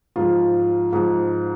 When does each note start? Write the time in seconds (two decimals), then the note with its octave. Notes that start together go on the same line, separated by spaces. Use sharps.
0.16 G#2 F3 F4
0.93 G#2 F3